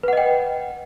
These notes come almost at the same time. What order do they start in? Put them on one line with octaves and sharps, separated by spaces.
B4 F#5 D#5 G5